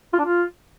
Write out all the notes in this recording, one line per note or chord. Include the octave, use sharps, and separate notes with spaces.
F4
D4
F4